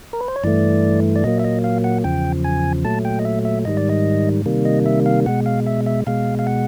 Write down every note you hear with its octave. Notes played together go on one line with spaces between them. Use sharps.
A#4
B4
C5
C#5
G2 E3 A3 D5
D5
A#2 F#3 A#3 D#5
E5
D#5
F5
F#5
E2 C#3 F3 G5
G#5
A#2 F#3 A3 A5
G5
D#5
E5
E5
G#2 D#3 G3 D#5
D5
D#5
C3 D#3 G3 A#3
D#5
E5
F5
B2 G#3 F#5
F5
E5
E5
B2 G#3 F5
F5
F#5